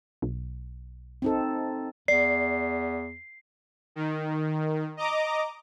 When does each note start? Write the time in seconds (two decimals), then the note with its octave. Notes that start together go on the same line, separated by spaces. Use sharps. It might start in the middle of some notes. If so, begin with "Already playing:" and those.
0.22 B1
1.22 C4 D#4 A4
2.08 E2 D5 C7
3.96 D#3
4.97 D#5 A#5 D6